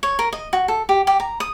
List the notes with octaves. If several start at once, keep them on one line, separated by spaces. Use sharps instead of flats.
C#5
A#4
D#5
F#4
A4
G4
G4
A#5
D#6